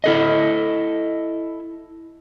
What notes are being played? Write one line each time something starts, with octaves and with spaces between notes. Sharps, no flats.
E4 A4 D#5